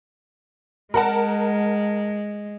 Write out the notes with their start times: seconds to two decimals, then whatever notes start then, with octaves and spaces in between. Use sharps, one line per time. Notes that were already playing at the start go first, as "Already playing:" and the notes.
0.94 G#3 A#4 F#5 A5